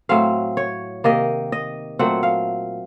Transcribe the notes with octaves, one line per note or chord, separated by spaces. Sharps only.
A2 F#3 C4 F5
C#5
C3 D#3 A#3 D#5
D#5
A#2 F#3 A3 C4 F#5
F5